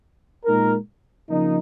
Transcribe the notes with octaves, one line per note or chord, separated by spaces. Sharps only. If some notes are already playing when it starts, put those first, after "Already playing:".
A#2 G#3 D#4 A#4
C#3 F3 A#3 D#4